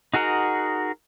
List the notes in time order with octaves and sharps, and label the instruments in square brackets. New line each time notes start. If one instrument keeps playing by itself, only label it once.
[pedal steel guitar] D#4 F#4 G#4 A#4 F#5